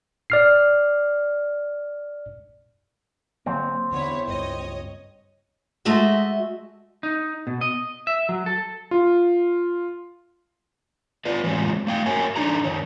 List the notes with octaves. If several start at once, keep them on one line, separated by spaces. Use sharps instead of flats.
D5 F6 C7
D3 F#3 A#3 C4
E2 D3 B3 E4 C#5
C#2 G2 C#5 D#5
G#3 A3 F#4 D#5 E5
D#4
B2
D#5
E5
F#3
A4
F4
F4 B4 D5
E3 F#3 G#3 B3 C4 F4
A3 F5 G5
F#4 A#4 C#5 G5 G#5
D4 D#4 A4 A#5
F#2 D#3 C#5